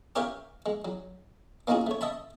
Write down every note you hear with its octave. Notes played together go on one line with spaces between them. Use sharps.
G4 A#4 C#5 E5 F5 G5
G#3
F#3
A#3 C#4 D#4 F4 F#4 G#4
A3 C#5
D#5 E5 A5 B5